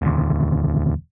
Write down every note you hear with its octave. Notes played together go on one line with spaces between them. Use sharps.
E1 D2